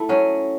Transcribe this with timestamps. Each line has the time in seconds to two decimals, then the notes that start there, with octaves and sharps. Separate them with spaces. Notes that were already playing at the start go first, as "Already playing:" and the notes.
Already playing: A3 E4
0.09 F#3 C#4